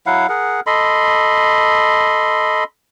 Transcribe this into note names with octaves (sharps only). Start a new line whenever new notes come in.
F#3 E4 F5 F#5
G#4 A#4 F#5
A4 D#5 B5 C6